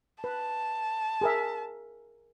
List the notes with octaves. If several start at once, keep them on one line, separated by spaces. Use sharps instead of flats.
B4 A5
G#4 A#4 E5